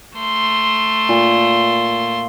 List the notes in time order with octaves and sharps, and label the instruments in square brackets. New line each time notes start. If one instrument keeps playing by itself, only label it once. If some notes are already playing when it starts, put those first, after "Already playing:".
[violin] A3 C6
[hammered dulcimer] A#2